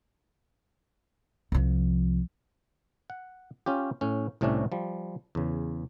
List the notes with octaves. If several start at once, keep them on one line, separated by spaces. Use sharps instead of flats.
C2 F3
F#5
C#4 F4 G4
A2 C#4
C2 A2 C3 A3 C#4 D4
F3 G3
E2 C#3